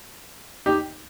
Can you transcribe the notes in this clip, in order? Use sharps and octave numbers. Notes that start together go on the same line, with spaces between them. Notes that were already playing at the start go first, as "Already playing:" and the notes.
D#4 G4